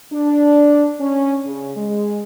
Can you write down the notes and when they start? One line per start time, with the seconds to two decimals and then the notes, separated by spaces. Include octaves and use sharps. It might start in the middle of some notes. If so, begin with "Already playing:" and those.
0.13 D4
1.00 C#4
1.46 C#3
1.76 G#3